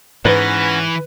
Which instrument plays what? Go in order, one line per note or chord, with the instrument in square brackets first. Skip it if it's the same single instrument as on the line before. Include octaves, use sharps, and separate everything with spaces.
[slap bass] G#2 [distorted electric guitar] E3 [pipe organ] C#4 F#5 A#6 [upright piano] B4